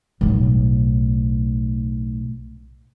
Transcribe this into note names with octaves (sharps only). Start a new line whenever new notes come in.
B1 A2